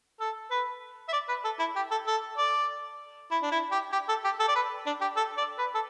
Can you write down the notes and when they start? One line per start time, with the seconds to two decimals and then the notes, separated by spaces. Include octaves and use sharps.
0.20 A4
0.51 B4
1.08 E5
1.12 D5
1.28 B4
1.44 A4
1.59 E4
1.76 G4
1.91 A4
2.07 A4
2.38 D5
3.31 E4
3.43 D4
3.51 E4
3.71 G4
3.92 G4
4.09 A4
4.24 G4
4.40 A4
4.48 D5
4.55 B4
4.86 D4
5.01 G4
5.16 A4
5.37 D5
5.58 B4
5.74 A4